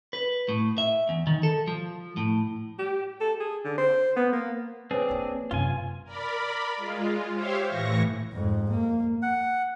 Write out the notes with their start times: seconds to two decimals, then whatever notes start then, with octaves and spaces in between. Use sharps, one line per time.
0.13 B4
0.49 A2
0.78 E5
1.09 E2
1.27 D#3
1.43 A4
1.68 F3
2.17 A2
2.79 G4
3.20 A4
3.40 G#4
3.65 D3
3.78 C5
4.17 B3
4.33 A#3
4.91 C4 D4 G#4 B4 C#5
5.09 F3 A#3
5.51 F#2 C3 F4 G#5
6.04 A#4 D5 B5
6.77 G#3 F4
7.32 G4 C5 C#5 E5 F5
7.67 A2 E3 C#6 A#6
8.32 F2 G#2
8.70 A#3
9.22 F#5